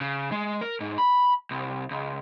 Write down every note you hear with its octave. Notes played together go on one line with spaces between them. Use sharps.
C#3
G#3
A#4
G#2
B5
C2
C#2